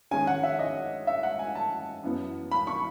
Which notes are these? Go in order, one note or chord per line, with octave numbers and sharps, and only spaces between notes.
D#3 G#3 C#4 G#5
F#5
E5
D#5
E5
F#5
G#5
A5
F#2 E3 B3
B5
C#6